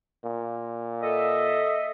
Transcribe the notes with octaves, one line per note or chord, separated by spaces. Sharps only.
A#2
A4 D#5 E5